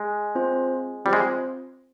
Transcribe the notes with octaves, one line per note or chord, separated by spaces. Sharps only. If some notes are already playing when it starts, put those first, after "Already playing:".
Already playing: G#3
C4 F4 C5
G3 C4 F4 C5
G#3